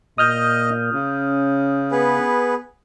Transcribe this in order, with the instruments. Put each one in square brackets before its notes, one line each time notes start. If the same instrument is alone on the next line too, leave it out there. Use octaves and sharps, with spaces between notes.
[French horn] A#2 [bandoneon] D#5 [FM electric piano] D#6 F6 G6
[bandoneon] C#3 [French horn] C#4
[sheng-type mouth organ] B3 G#4 B4